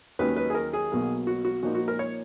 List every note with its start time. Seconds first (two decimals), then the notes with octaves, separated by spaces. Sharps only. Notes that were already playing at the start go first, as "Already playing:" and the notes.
0.19 D#2 D#3 F#3 C#4 B4
0.36 B4
0.50 G#4
0.55 A#4
0.73 G#4
0.92 B1 B2 F#3 A#3
1.27 F#4
1.45 F#4
1.63 A#2 F3 A#3 D#4 F#4
1.75 F#4
1.88 A#4
1.99 C#5